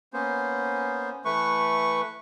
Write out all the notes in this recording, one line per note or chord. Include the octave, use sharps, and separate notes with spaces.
A#3 B3 C#4 C5
E3 A3 B4 C#6